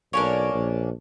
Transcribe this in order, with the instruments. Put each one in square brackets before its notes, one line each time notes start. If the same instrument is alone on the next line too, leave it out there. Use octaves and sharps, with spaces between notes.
[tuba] B1 [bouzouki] A#3 C#4 D4 [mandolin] A#4 C#5
[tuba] A#1